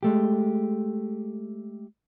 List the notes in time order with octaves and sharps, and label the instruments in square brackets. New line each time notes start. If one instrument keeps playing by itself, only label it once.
[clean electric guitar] G#3 A3 G4